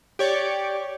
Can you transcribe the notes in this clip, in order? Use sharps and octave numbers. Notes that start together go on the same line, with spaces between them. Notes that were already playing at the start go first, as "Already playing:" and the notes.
G4 C#5 D5